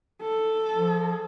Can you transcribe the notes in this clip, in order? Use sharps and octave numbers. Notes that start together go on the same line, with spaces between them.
A4
F3